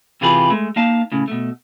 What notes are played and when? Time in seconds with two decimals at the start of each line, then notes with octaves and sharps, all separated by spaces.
0.21 C3 E3 F4 G4 G#4 B4
0.50 G#3 A3
0.76 A#3 D#4 F5 A5
1.12 A2 C#3
1.28 B2 A3